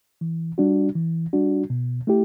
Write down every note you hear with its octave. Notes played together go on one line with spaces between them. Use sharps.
E3
G3 D4 F#4
E3
G3 D4 F#4
B2
A3 E4 G4